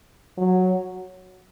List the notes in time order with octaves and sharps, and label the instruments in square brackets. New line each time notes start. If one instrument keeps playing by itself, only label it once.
[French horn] F#3